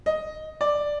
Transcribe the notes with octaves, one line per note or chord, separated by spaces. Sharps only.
D#5
D5